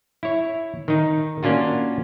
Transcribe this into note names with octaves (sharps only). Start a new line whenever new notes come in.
E4 C#5
D#3 D#4
A#3 C#4 D4 F4 F#4